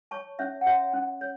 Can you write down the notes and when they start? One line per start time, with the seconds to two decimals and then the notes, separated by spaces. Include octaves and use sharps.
0.11 C#5 A5 C#6
0.39 C#4 C#5 E5
0.61 F#5
0.66 F#4 C#5 E5
0.93 C#4
1.21 C#5